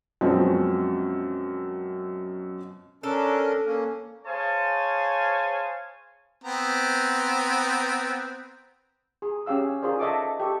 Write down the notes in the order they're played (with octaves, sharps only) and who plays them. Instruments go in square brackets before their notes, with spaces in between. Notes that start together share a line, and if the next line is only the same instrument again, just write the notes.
[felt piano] F#2 B2 F3 G#3 C4 C#4
[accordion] C#4 D4 A#4 [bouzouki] A4
[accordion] A#3 C#4
[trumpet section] G#4 C5 C#5 F5 G#5 A5
[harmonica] B3 C4 A#5
[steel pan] G#4
C#4 G4 G#4 F5 E6
D#4 F4 G#4 A#4 C5 D5
A4 D#5 E5 A5 C#6 D6
G4 A4 C#6